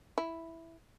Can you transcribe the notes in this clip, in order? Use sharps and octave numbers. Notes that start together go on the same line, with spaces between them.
E4